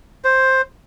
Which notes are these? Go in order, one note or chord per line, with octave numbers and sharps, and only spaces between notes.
C5